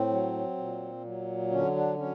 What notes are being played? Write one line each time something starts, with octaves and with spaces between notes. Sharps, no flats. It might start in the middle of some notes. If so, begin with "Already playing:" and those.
Already playing: A2 C4
F#3
A#2
F#3
D3 C#4
D4
F#3 C#4